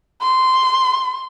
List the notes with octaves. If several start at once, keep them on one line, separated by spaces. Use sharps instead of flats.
C6